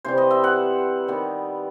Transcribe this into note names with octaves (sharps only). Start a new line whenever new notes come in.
C3 E3 G3 C5
D#5
E5
F#5
D#3 G3 B3